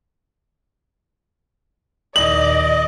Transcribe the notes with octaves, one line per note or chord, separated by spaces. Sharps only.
D#2 A#2 D5 D#5 F#7